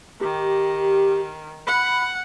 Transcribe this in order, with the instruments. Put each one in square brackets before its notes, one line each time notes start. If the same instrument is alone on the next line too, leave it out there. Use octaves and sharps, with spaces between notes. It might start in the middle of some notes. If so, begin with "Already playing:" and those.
[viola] D#3 [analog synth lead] G4
[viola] F#5 [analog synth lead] B5